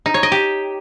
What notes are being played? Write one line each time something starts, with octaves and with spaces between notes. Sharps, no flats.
D#4
C#5
D#5
G4